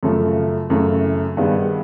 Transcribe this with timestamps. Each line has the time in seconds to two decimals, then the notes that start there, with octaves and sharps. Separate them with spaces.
0.03 F#2 C#3 F3 A3
0.70 F#2 C#3 E3 A3
1.37 G2 D#3 G#3 B3